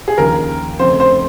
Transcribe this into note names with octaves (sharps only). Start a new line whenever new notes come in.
G#4
D#2 C#3 F3 A#4
F1 F2 C#3 C5
C5